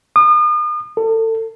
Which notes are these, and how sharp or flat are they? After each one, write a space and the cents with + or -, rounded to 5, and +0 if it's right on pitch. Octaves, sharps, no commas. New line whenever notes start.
D#6 -40
A4 +30